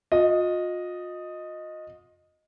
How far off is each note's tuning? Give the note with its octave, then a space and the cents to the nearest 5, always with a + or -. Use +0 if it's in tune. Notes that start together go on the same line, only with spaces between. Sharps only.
F4 +40 D#5 +0